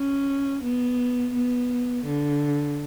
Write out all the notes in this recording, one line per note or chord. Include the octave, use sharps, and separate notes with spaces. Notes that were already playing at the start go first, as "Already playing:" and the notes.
Already playing: C#4
B3
B3
D3